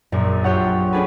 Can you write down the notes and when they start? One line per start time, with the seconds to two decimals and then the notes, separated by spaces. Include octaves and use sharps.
0.12 A#1 F#2 A#2
0.44 F4 G4 C#5 F#5
0.93 C#4 D4 G#4 A4 B4